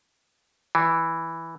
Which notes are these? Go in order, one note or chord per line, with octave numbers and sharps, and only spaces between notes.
E3